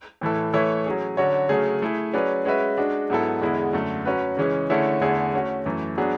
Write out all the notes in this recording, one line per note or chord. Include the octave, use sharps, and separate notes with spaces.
A2 E3 A3 E4 A4
E3 A3 E4 A4 C#5
F#3 C#4 G#4
D3 F#3 C#4 F#4 C#5
C#3 F#3 A3 C#4 G#4
A3 E4 G#4
F#3 C#4 G#4 B4 D5
G#3 C#4 F#4 B4 E5
G#3 D4 F#4
G#2 F#3 B3 E4 A4
E2 D3 G#3 B3 E4
F#2 D3 A3
F#3 C#4 F#4 B4
C#3 E3 G#3 C#4
D3 A3 C#4 E4 G#4
E2 D3 A3 E4 G#4
A3 C#4 F#4
F#2 E3 A3
F#3 B3 D4 G#4